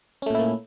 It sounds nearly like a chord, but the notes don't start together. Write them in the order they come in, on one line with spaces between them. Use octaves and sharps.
C#4 A3 A#2 E4 A#3